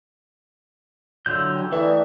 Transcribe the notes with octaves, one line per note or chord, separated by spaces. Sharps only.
D3 F#3 F4 E5 G6
E3 G4
E3 A3 D4 D#4 A4 E5